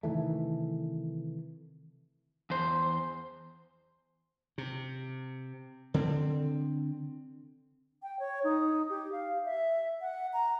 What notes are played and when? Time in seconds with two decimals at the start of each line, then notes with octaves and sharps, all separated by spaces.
0.03 C3 D#3 E3 A3
2.50 E2 C5
4.58 C3
5.94 D3 C4
8.03 G5
8.19 C#5
8.44 D#4
8.90 G4
9.12 F5
9.45 E5
10.01 F#5
10.33 A#5